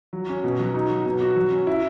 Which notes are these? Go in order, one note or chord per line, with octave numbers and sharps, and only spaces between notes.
F#3
C#4
B2
F#3
D#4
F#3
B2
F#4
F#3
C#4
E4